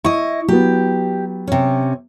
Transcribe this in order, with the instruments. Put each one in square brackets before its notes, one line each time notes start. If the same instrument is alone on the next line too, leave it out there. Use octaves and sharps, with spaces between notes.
[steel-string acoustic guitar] E4 D#5 [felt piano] C#6
[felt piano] F#3 B3 [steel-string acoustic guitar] G4
[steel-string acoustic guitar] C3 C#4